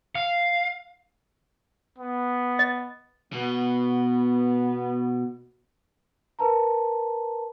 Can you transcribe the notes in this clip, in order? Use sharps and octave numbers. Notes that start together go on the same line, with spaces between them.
F5
B3
D#5
B2 B3
A#4 B4 A5 A#5